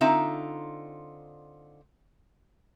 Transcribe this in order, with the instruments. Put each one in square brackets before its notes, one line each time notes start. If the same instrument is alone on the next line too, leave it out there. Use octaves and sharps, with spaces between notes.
[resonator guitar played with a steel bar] D3 C4 D#4 F4 E5 A#5